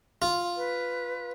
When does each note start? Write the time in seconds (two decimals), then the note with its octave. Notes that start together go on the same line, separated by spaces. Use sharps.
0.22 F4
0.57 B4